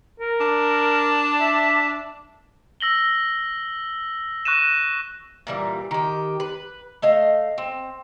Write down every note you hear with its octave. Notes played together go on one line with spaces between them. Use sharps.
A#4
D4
E5
E6 A#6 F#7 G7
C#6 F#6 A#6 D#7 E7
A#2 E3 G3
D#3 G4
B4
A3 D#5 F5
C4